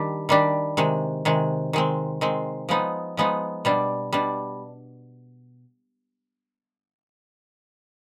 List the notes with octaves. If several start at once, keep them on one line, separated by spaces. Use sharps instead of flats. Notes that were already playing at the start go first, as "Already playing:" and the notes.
Already playing: D#3 G3 D4 G4
D#3 G3 D4 G4
C3 D#3 G#3
C3 D#3 G#3
D#3 G#3 C4
D#3 G#3 C4
F3 G#3 B3 D#4
F3 G#3 B3 D#4
B2 G3 D4
B2 G3 D4